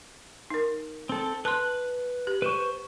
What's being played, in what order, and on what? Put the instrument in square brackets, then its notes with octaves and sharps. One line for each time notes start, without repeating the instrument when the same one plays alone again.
[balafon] D#4 A#4
[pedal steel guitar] C4 A4
[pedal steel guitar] B4 F#6 [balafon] A5 C6
[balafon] G4
[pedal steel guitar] B4 C5 C#6